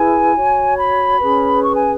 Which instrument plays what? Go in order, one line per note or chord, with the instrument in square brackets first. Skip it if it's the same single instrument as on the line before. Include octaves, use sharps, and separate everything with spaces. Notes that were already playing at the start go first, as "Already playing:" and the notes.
Already playing: [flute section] E4 G#4 B4 G#5
F#4 C#5
B5
C#4 G#4 B4
C#6
G#5